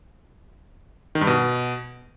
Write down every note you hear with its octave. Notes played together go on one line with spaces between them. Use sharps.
D#3
G2
B2